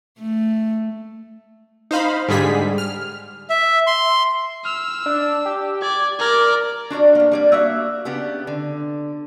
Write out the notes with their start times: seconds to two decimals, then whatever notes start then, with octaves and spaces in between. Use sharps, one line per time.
0.19 A3
1.91 D#4 C5 F5 B5
2.29 G#2 D3 G3 G#4 B6
2.78 F6
3.50 E5
3.87 C6
4.65 E6 F6
5.06 D4
5.45 G4
5.82 D5 G#6
6.19 A#4 D5
6.90 D4 F#4 A#4 D5
7.15 A#3 B3
7.32 G3 A#3 D5
7.52 A#3 F#4 E5
8.05 C#3 B3 D4 G4
8.47 D3